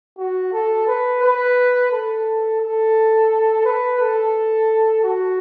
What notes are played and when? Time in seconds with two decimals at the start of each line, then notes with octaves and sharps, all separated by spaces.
0.18 F#4
0.53 A4
0.87 B4
1.23 B4
1.92 A4
2.62 A4
3.65 B4
4.00 A4
5.04 F#4